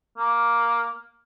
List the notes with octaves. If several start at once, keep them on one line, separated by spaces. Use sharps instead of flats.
A#3